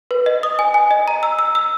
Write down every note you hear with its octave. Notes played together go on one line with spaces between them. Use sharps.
B4
D#5
D#6
G#5
G#5
D#5
A#5
E6
E6
E6